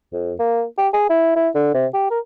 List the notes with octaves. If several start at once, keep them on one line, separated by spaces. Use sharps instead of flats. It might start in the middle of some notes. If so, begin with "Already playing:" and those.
F2
A#3
G4
G#4
E4
E4
D3
C3
G4
A#4